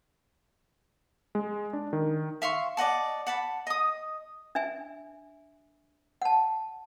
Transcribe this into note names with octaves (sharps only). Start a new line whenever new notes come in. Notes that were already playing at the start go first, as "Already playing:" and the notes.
G#3
D4
D#3
E5 F5 C6 C#6
D5 D#5 F#5 A5
F#5 A5 B5
D#5 D#6
D4 E5 G#5
F#5 A5